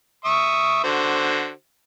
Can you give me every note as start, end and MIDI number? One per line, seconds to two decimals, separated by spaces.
0.25 0.82 76
0.25 0.82 85
0.25 0.82 87
0.84 1.51 50
0.84 1.51 66
0.84 1.51 72